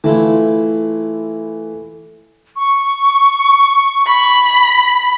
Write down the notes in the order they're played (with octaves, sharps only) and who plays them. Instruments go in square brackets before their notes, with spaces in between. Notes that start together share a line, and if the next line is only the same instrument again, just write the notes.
[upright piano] E3 [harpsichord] A3 E4 F4
[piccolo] C#6
[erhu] B5